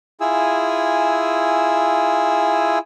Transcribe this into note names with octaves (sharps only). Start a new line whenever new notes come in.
E4 F4 G#4 G#5 E6